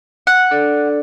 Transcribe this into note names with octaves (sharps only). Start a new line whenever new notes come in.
F#5
D4 A4 D5